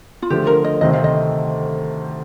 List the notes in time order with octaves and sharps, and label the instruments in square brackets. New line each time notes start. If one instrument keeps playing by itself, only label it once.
[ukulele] F4
[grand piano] D3 F3 A3 [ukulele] G4
[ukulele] A#4
D#5
[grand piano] D2 C3 D#3 A3 C4 [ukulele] D#5
[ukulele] F5
D#5